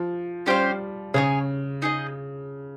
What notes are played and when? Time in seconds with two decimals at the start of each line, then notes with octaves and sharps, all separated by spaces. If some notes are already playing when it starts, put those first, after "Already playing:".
Already playing: F3
0.46 G3 C#4 G4 C5 F5
1.14 C#3 G#4 C#5 G#5
1.82 D#4 G#4 D#5